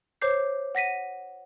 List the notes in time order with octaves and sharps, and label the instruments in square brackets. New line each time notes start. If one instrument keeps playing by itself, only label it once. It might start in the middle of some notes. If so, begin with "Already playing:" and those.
[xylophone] C5 C#5 D6 G6 C7
F#5 A#6 B6 D#7